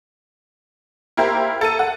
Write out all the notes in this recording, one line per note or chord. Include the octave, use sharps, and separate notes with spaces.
A#3 E4 G4 A#4 C5
A4 D#7
F#5